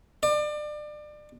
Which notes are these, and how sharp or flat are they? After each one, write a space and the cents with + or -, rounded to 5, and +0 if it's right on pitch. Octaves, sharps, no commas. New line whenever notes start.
D5 +30